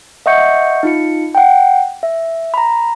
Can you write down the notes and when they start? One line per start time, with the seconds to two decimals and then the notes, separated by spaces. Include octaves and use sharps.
0.26 D#5 E5 F#5 C#6 G6 C#7
0.83 D#4 F4 C#7
1.35 F#5 G5
2.03 E5
2.54 A#5 B5